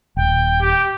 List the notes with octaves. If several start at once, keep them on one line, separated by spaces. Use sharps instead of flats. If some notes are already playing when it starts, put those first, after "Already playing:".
D#1 G5
G4